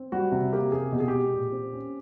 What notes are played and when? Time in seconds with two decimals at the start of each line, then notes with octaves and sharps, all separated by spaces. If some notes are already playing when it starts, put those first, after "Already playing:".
Already playing: C4
0.12 G3 F#4
0.32 C3
0.53 A#3 G4
0.72 C3 G#4
0.92 B2 G4
1.00 G#4
1.08 G#3 G4
1.33 A#2
1.52 C4
1.73 C#4